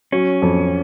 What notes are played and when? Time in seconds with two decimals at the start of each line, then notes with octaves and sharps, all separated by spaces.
0.12 F#3 C#4
0.42 F2